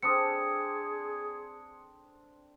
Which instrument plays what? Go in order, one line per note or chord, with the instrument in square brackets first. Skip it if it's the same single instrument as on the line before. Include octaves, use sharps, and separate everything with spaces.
[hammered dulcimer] C4 D4 A4 [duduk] G#4 [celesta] D#6 C#7